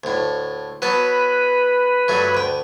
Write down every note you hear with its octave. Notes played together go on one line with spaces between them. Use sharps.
D2 A2
F#3 B3 B4 A5
G2 F#3 A3
D2 G5